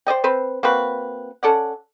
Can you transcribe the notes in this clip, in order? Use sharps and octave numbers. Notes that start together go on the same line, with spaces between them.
C5 D5 D#5 G5
C4 B4 C5
A#3 C4 F#4 B4
C#4 A4 D5 F#5